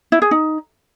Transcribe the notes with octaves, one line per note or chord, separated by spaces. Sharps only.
E4
G#4
D#4